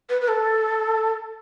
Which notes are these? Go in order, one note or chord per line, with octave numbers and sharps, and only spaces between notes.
B4
B4
A4